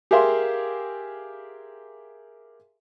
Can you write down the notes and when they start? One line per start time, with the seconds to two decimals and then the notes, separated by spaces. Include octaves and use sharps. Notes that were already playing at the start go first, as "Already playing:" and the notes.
0.11 G4 G#4 A#4 E5 F5 C6